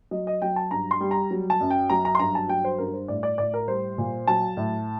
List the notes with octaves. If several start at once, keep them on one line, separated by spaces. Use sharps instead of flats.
F#3 D#5
D#5
F#3 G5
A5
G2 A#5
C6
G3
A#5
F#3
A5
F#2
G5
F#3 A#5
A#5
C6
G2 A#5
A5
F#3 G5
C5
G2 A#4
C5
A2 D5
D5
A2 D5
A#4
G3 C5
A#2
F#3 A5
A2